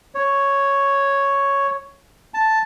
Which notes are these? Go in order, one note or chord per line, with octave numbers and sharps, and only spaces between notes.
C#5
A5